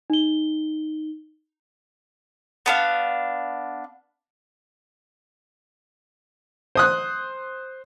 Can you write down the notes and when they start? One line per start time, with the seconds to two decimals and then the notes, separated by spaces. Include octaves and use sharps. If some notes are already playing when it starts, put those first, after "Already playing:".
0.10 D#4 G7
2.66 B3 D4 F5
6.75 C5 D#6 F#6